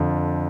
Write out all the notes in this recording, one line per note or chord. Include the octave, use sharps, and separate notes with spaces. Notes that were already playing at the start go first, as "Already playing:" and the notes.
Already playing: F2 D3 F3